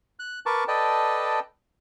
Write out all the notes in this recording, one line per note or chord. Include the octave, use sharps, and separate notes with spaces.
F#6
A#4 B4 A5 C#6 D6
A4 B4 D5 D#5 G5 A5